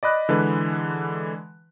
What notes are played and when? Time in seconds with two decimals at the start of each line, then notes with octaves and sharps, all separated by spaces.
0.03 D5 D#5 B5 F#6
0.29 D3 E3 G#3 B4